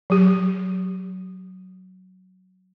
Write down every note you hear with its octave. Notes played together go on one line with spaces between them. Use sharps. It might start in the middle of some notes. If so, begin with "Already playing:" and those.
F#3 G4